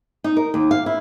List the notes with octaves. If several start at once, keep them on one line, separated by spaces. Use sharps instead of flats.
D#4
A#4
D#2
F5
E4